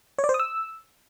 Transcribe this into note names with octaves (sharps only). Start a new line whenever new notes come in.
C#5
D5
C5
D#6
E6